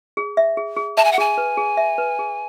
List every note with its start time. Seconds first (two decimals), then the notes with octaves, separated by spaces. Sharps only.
0.17 G#4
0.37 E5
0.57 G#4
0.76 G#4
0.97 E5 A5
1.05 G#5
1.12 F#5
1.18 G#4 G#5
1.38 B4
1.57 G#4
1.77 E5
1.98 B4
2.19 G#4